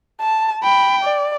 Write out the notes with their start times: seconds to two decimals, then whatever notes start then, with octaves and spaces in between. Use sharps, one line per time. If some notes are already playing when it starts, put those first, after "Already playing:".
0.21 A5
0.64 G5 B5
1.03 D5